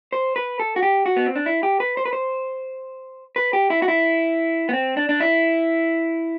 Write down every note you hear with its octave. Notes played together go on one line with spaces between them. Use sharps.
C5
B4
A4
F#4
G4
F#4
B3
C4
D4
E4
G4
B4
C5
B4
C5
B4
G4
E4
F#4
E4
B3
C4
D4
D4
E4